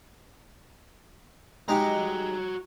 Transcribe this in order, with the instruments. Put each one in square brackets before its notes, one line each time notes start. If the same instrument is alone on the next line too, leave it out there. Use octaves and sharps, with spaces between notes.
[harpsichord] G#3 D#4 G4 [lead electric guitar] F#4 A#5